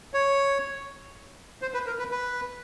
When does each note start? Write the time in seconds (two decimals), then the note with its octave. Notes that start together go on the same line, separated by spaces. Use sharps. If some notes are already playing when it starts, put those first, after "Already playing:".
0.14 C#5
1.62 C5
1.74 B4
1.87 A#4
1.99 B4
2.11 B4